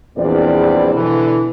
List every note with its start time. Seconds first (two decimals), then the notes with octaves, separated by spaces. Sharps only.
0.17 A#1 E2 G3 C4 D5
0.94 B2 D3 E3